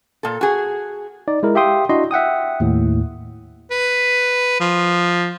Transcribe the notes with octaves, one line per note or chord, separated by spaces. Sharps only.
A#2 A4
F#4 G#4
D#4 D5
G#3 E4 A#4
G4 E5 F5 G5 C6 D#6
D4 E4 F#4 D#5 C6
E5 F#5 G5 D#6
D#2 A2
B4
F3